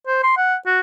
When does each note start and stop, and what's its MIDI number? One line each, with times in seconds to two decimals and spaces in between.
0.07 0.21 72
0.24 0.35 84
0.37 0.55 78
0.66 0.80 66